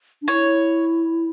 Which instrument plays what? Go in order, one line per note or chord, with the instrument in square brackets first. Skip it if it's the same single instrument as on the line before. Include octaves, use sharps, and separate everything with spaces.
[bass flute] D4
[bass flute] E4 [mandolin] C#5